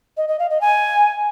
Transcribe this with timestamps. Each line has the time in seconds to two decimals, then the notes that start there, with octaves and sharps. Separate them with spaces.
0.17 D#5
0.28 D#5
0.39 F5
0.50 D#5
0.61 G#5